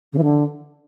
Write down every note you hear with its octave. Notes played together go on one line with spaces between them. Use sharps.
C#3
E3
D3